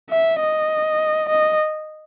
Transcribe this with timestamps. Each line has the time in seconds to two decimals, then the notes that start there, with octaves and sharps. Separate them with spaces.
0.10 E5
0.40 D#5
1.29 D#5